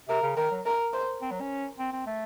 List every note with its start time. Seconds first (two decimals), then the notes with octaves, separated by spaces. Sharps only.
0.08 C3 A#4
0.22 C#3
0.36 D#3 A#4
0.51 F#3
0.66 A#4
0.93 C5
1.22 C4
1.31 F#3
1.40 C#4
1.79 C4
1.93 C4
2.06 A3